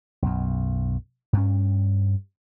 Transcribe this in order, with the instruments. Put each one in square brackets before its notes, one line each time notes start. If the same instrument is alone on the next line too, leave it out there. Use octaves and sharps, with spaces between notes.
[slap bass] B1 F#2
G2 C#4